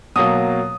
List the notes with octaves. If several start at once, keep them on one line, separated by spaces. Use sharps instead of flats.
B2 F#3 A#3 D#6